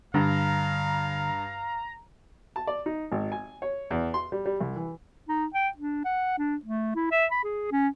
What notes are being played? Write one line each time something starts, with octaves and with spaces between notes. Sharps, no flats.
G2 D3 F5 A#5
A5
D5
D#4
G#1
G#5
C#5
E2
C6
G3
G3
C2
E3
D#4
G5
D4
F#5
D4
A3
E4
E5
B5
G#4
C#4